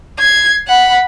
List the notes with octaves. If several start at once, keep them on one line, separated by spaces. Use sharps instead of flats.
G#6 C7
F#5 B5